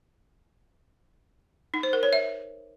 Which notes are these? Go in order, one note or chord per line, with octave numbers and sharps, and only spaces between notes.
D#4
C5
A#4
C#5
E5